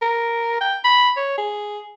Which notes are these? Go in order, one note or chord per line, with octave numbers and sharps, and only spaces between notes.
A#4
G5
B5
C#5
G#4